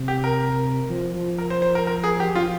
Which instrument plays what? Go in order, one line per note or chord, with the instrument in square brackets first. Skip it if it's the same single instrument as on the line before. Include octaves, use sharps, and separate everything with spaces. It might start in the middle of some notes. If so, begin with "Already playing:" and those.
Already playing: [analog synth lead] C3
[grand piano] G4
A#4
[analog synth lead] F3
F3
[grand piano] A#4
C5
C5
A#4
A#4
G#4
G4
[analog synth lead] F3 [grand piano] F4